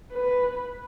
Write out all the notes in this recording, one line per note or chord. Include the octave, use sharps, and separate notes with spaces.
B4